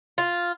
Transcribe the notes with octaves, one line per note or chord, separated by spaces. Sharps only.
F4